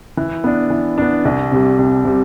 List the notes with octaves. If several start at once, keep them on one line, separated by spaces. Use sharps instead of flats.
E3
B3 D4
E3
B3 D4
C2
C3 G3
C2
C3 G3